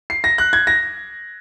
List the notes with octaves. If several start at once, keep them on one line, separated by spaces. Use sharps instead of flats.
C7
A#6
F#6
G#6
A#6